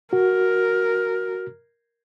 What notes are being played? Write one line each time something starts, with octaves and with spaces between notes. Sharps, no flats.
F#4 A#4